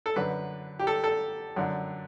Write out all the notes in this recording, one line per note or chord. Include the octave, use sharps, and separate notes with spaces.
A4
F#2 D3 B4
G4
A4
A4
F#2 D3